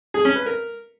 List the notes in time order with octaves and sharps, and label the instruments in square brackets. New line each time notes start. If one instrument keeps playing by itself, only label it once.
[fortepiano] G#4
C#4
B4
A#4